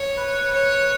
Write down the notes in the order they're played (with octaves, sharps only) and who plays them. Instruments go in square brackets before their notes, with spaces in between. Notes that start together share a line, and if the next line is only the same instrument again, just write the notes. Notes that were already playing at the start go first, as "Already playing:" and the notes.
Already playing: [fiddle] C#5
[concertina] B4
[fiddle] C#5